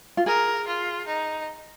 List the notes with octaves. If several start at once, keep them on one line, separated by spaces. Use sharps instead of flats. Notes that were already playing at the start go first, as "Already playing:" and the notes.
F4
G#4 A#4
F4
D#4